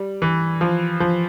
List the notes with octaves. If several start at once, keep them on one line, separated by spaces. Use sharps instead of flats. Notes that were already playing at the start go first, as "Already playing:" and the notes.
Already playing: G3
E3
F3
F3